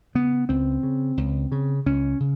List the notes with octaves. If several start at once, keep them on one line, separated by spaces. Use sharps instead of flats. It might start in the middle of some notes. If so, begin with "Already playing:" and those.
C#3 B3
C#2 C4
C#3
C#2
C#3
C#2 C#4
C#3